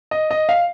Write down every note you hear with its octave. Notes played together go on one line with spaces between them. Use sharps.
D#5
D#5
F5